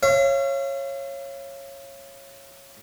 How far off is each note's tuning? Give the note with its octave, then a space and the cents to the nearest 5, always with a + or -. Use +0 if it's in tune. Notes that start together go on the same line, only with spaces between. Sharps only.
C#5 -15 F5 -40